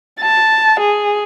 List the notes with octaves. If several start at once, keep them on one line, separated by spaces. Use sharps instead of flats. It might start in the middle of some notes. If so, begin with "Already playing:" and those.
A5
G#4